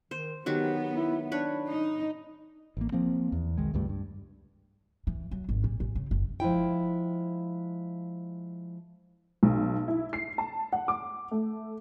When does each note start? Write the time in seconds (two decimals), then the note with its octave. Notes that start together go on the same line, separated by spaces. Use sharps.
0.11 D#3 C5
0.46 D#3 F#3 B3 F#4 G4
0.95 E4
1.32 D4 B4 C#5
1.67 D#4
2.77 A1 A#3
2.92 F3 A#3 C4
3.32 E2
3.58 B1 D#3 G#3
3.74 C#2 G2 G3 A3
3.89 G2
5.07 E3
5.31 F#3
5.49 G#1
5.64 A#2
5.80 A1
5.95 C#3
6.11 F#1
6.40 F3 G#3 E4 G5
9.43 B1
9.88 E4
10.13 C7
10.38 A5
10.73 F#5
10.88 D6
11.31 A3